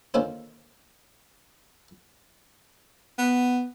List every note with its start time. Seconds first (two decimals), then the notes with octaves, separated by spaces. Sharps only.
0.14 D3 D#3 A#3 C#4 F4 C5
3.18 B3